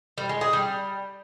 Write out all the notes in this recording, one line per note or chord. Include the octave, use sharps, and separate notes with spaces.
G3
G#3
G#4
G3